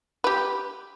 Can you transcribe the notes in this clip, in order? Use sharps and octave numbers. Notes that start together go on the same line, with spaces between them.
G4 B4